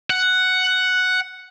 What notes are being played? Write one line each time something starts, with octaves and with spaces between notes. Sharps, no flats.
F#5